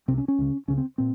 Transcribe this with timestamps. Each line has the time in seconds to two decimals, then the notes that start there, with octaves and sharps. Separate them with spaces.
0.08 C2 C3 C4
0.18 C#4
0.28 C#4
0.38 C#2 C#3
0.68 C#2 C#3 C#4
0.78 C4
0.98 A#2 C4